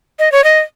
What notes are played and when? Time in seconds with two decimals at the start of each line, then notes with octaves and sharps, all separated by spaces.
0.19 D#5
0.32 C#5
0.44 D#5